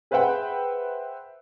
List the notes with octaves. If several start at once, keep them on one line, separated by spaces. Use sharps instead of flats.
G#4 B4 C5 E5 F#5 G5